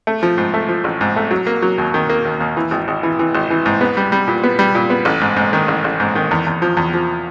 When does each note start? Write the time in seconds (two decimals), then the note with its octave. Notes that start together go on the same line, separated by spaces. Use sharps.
0.07 A3
0.23 F3
0.38 G#2
0.54 A3
0.69 F3
0.84 A1
1.01 G#2
1.16 A3
1.31 F#3
1.47 A#3
1.62 F#3
1.78 D#2
1.94 D#3
2.10 A#3
2.25 D#2
2.40 D#2
2.57 E3
2.71 G#1
2.88 G#1
3.03 E3
3.19 E3
3.35 G#1
3.50 E3
3.66 G#2
3.81 B3
3.97 G3
4.12 G3
4.28 A#2
4.43 B3
4.59 G3
4.75 A#2
4.90 B3
5.05 A1
5.21 G#2
5.36 G#2
5.53 D#3
5.68 A1
5.84 A1
6.00 G#2
6.15 D#3
6.31 E2
6.46 E2
6.62 F3
6.77 E2
6.94 F3